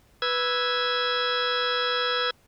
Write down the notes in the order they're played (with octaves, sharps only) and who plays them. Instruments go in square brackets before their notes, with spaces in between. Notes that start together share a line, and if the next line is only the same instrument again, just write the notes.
[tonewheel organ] B4 E6 G#6